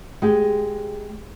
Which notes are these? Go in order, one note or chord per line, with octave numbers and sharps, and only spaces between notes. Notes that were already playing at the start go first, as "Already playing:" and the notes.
G#3 G4